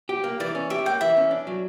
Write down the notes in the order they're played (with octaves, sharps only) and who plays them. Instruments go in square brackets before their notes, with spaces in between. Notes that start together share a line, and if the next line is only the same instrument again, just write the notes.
[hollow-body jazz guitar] G4
A#3
[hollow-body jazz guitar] E3 [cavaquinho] D5
[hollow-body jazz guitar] C#4
[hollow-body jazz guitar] G4 [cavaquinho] E5
[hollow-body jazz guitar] A#3 [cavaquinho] G5
[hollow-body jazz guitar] E3 [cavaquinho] E5
[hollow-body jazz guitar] C#4
D4
F#3